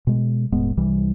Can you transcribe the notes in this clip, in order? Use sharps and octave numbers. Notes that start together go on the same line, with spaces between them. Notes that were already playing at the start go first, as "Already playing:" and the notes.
B2 G#3
E1 A2 G#3 B3
C2 C3 E3 G3